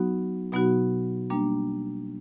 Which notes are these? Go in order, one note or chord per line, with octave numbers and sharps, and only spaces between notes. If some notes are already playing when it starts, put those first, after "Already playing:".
Already playing: F#3 B3 D#4 F#4
B2 F#3 B3 D#4 F#4
G3 A#3 D4